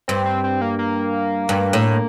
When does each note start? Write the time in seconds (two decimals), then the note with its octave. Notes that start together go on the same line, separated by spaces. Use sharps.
0.08 G2 C4
0.26 C4
0.44 C4
0.61 A#3
0.79 A#3
1.49 G2
1.73 A2